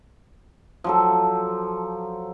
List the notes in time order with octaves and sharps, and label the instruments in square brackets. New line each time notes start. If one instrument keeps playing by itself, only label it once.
[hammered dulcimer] F3 F#3 A4